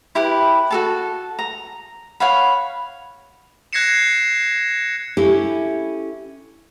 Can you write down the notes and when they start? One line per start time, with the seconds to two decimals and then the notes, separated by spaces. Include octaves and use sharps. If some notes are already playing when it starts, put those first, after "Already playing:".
0.15 E4 G4 B4
0.71 F#4 A4 A5
1.39 A#5
2.20 C#5 F5 F#5 B5
3.73 F#6 G#6 A#6 C7 C#7 E7
5.17 C#4 E4 G4 A4